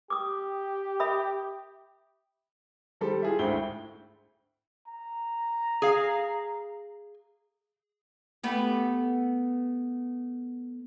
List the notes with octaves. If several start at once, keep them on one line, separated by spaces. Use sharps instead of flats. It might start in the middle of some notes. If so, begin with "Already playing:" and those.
G4 D6 D#6
E5 B5 D#6
D#3 G3 G4 A4 C5
F4 G#4 E5
G#1 D2 E4 C5 G5 G7
A#5
G#4 F5
A3 B3 G4